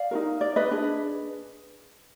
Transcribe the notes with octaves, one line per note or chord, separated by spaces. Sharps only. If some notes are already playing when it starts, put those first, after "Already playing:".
Already playing: D5 F5
D#4 F#4 A#4
D5
B4 D#5
D4 G#4 B4